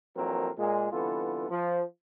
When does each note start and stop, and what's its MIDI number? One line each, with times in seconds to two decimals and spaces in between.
0.17 0.50 34
0.17 0.50 52
0.17 0.50 54
0.17 0.50 60
0.17 0.50 69
0.17 0.50 70
0.58 0.91 46
0.58 0.91 56
0.92 1.48 36
0.92 1.48 50
0.92 1.48 52
0.92 1.48 59
0.92 1.48 65
0.92 1.48 69
1.50 1.83 53